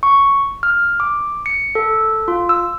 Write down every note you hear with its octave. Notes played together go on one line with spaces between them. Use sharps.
C#6
F6
D6
C#7
A4
F4
E6